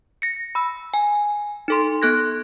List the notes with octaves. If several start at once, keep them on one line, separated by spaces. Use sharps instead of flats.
A#6 C#7
B5 E6
G#5
D#4 A4 C6
B3 A4 F#6 G#6 A#6